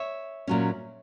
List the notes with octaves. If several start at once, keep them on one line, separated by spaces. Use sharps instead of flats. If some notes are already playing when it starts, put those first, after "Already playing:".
Already playing: C#5 E5
A#2 F#3 C#4